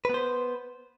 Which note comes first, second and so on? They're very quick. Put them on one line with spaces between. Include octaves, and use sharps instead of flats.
B4 B3 C5